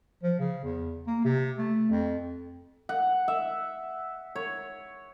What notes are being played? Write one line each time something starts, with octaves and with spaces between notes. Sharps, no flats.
F3
C#3
E2
A#3
C3
A3
F2
F#5
E5
C#5